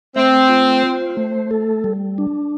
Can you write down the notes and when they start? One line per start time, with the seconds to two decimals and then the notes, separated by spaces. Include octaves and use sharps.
0.16 A3 C4
0.49 F4
0.83 C5
1.17 A3
1.51 A4
1.84 G3
2.18 D4